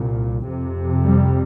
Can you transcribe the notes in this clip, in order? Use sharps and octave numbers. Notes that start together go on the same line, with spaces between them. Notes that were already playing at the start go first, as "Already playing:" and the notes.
Already playing: C2 A#2
F2 C3
G3